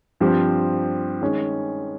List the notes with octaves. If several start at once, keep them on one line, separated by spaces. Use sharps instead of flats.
G2 F3 C4 G4
D#3 G#3 C#4